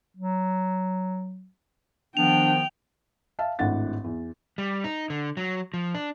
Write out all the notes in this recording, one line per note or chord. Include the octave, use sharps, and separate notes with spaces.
F#3
D#3 F3 B3 D4 G5 F7
E5 F5 A5
G#1 A2 D4 F#5 A6
E2
G3
D#4
D3
F#3
F3
D4